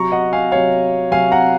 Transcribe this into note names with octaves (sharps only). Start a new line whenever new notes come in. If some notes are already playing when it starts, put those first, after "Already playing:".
Already playing: C3 F#3 A#5 C#6
D#5 F#5
F5 G#5
C3 F#3 C#5 F5
C3 F#3 F5 G#5
F#5 A#5